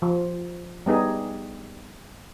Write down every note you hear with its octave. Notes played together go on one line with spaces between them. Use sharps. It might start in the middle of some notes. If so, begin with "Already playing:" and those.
F3
G3 B3 D#4 G#4